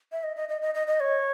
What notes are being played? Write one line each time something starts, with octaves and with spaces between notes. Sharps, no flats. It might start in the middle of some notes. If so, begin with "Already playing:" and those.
E5
D#5
D#5
D#5
D#5
D#5
D#5
C#5